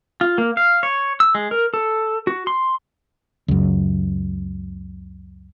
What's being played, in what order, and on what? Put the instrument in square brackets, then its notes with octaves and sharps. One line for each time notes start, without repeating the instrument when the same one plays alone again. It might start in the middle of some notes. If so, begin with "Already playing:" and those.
[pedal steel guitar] F4
A#3
F5
C#5
E6
G#3
A#4
A4
F#4
C6
[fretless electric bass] C#2 F#2